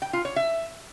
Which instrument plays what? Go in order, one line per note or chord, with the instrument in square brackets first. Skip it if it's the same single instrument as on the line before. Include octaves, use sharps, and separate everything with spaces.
[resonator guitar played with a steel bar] G5
F4
C#5
E5